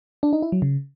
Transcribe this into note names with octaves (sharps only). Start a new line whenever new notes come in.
D4
D#4
E4
F#3
C#3